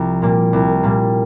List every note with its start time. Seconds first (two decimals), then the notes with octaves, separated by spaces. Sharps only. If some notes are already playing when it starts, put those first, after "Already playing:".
Already playing: C2 F3 A#5
0.22 A#2 G3 A#3
0.53 C2
0.83 A#2 G3 A#3